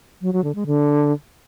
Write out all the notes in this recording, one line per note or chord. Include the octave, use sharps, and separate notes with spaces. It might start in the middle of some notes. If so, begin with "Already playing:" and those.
F#3
F#3
D3
G#3
D3